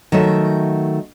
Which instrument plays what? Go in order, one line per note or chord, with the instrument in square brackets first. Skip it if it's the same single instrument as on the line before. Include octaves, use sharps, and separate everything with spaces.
[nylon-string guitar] D#3 F#3 A3 E5